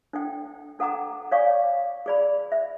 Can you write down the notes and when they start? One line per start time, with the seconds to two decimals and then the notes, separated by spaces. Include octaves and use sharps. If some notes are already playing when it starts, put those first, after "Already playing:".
0.13 D4 A4 G5
0.79 D4 A4 F#5 G5 A#5 D6
1.31 C#5 D5 F5 G#5 C#6 D6
2.06 G#4 D5 B5
2.52 E5